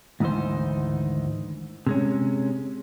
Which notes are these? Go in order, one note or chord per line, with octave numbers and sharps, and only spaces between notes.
D2 G#2 D#3 E3 D#4 C5
C3 G#3 C#4